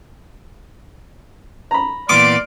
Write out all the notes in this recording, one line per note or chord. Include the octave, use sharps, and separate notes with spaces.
A#5 B5
A#2 E3 B3 D5 C6 D6 F6